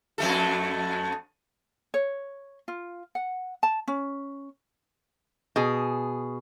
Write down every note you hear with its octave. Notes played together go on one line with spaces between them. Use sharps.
F2 A3 A4
C#5
F4
F#5
A5
C#4
B2 G#4